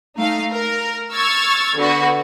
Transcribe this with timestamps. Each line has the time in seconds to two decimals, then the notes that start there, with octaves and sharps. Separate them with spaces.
0.17 A3 D#4 F5
0.52 A#4
1.12 C#6 E6 F6 G#6 A6
1.77 D3 B3 F#4